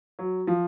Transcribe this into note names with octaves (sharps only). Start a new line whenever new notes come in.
F#3
F3